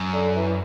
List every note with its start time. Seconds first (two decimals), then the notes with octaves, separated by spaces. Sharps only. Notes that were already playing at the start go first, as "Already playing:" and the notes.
Already playing: F#2
0.13 D3
0.35 E3